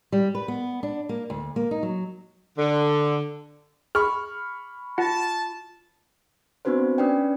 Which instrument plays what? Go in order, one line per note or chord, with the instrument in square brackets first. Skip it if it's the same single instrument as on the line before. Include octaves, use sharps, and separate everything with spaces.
[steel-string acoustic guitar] G3
B4
B3
D4
A#3
D2
A#3
D#4
F#3
[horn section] D3
[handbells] G#4 [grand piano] B5 C#6 F6
[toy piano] F4 [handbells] F#5 [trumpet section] A5
[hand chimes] B3 C4 D4 F#4 B4 C5
C#4 D4 B4 D5 G5